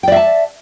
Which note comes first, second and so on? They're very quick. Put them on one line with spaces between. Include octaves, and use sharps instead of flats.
G5 D5 E5 A5